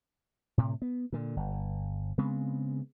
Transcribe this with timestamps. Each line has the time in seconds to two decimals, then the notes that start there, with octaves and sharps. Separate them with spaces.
0.58 A2 C3
0.82 B3
1.12 A#2 D3
1.37 G1
2.18 C#3 G#3 B3 C4